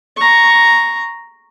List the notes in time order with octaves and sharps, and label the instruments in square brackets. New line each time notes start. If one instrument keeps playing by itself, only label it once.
[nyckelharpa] A#5 C#6